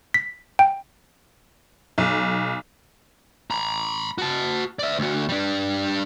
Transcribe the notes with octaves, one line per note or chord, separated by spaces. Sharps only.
B6
G5
B1
A#5 B5
F#4 A5
D5 E5
D2 F#4
G3 D4